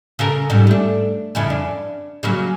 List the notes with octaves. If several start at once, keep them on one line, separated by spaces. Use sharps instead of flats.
C#3 A4 A#4
G#2 C3 G3
A3 D4
F2 C#3 E4
D4
C#3 F#3 A#3